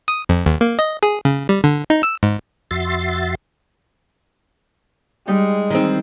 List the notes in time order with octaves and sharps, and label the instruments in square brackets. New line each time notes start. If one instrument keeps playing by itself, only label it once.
[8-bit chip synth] D#6
F2
D#2
A#3
D#5
G#4
C#3
G3
D3
D#4
E6
G#2
[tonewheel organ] F2 F#4 E5 C6 A6
[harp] G3 D#4 [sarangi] G#3
[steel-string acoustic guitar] D#3 E3 C4